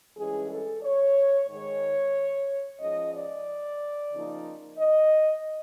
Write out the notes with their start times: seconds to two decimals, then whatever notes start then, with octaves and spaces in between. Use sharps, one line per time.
0.17 G2 E3 G#3 C#4 G#4
0.50 A4
0.83 C#5
1.48 G#2 D#3 G#3 C#5
2.80 G#2 F3 G#3 C#4 D#5
3.14 D5
4.12 C#3 F3 A#3 D#4
4.78 D#5